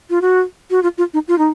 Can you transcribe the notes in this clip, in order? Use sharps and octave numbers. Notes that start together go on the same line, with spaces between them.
F4
F#4
F#4
F4
F4
D#4
F4
D#4